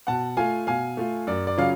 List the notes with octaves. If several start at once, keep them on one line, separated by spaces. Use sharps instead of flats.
B2 F#5 A5
A3 F4 F5 G#5
B2 F5 G#5
A3 F4
F#2 D5
D5
C#3 F#3 C#4 F4 F5